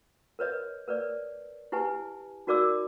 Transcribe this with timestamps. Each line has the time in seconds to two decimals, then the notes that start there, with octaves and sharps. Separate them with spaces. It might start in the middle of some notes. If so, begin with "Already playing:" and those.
0.39 A#4 B4 C#5 D#5
0.88 A#4 B4 C#5 D5
1.72 E4 G4 B4 G#5 A5
2.47 D#4 F#4 A#4 D5 D6 E6